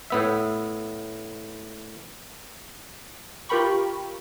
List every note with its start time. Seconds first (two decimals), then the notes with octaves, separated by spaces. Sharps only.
0.10 A2 B3 E5
3.49 F4 G4 A#4 G5 B5 C#6